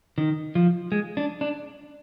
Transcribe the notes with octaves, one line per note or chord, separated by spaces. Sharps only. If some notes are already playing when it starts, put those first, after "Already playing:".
D#3
F3
G#3
D4
D4